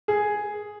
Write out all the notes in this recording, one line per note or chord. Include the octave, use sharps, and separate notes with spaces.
G#4